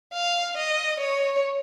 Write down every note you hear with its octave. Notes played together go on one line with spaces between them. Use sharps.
F5
D#5
C#5